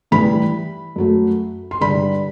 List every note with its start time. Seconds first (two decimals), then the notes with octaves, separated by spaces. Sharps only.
0.11 A2 E3 G3 B5
0.96 F#2 F#3 A3
1.71 C6
1.81 G2 D3 G3 B5